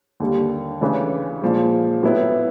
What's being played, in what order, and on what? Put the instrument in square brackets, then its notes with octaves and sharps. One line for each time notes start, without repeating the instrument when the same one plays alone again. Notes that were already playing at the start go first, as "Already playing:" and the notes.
[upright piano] D#2 D3 G3 A#3
C#3 E3 A3 D4
A#2 F3 G#3
A2 F#3 B3 E4